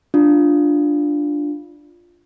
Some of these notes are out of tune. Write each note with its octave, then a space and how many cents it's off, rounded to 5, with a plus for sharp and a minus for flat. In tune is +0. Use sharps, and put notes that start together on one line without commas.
D4 +0 F4 +0